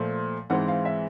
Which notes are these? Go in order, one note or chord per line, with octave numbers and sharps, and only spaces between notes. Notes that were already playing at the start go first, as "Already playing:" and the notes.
Already playing: A#2 F3 A3
G#2 E3 G#3 C4 F#5
F5
E5